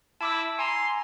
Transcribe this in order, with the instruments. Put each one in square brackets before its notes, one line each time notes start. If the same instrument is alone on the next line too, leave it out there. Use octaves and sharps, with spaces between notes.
[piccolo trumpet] E4 [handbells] A5 D6 E6
[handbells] G#5 A#5 [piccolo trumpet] C6